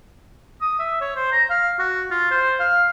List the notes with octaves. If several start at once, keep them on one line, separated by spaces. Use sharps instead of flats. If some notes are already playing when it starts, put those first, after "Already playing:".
D#6
E5
C#5
C5
A#5
F5
F#4
F4
C5
F5